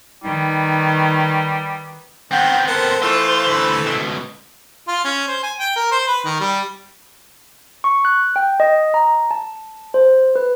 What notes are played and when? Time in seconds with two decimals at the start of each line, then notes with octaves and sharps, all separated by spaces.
0.24 D#3 G3 D#4 B4
2.31 D#3 B3 C4 F#5 G5
2.67 A4 A#4 C5 F#5
3.02 E3 A3 F4 A4 E6
3.46 D2 B4
3.87 C#2 B2
4.88 F4
5.05 C#4
5.28 C5
5.43 G#5
5.59 G5
5.76 A#4
5.92 C5
6.07 B4
6.25 D#3
6.40 G3
7.84 C#6
8.05 F#6
8.36 G5
8.60 D#5
8.94 A#5
9.31 A5
9.94 C5
10.35 B4